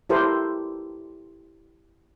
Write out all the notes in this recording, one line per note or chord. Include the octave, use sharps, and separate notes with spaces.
E4 G4 A4 A#4 C5